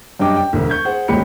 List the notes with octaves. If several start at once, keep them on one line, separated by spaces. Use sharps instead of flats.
F#2 G3 D4 D#5 G5 D6
G5
E1 D2
C#6 G6 G#6
G#4 C5 F#5
D#1 A1 G#3 G4 B5 C#7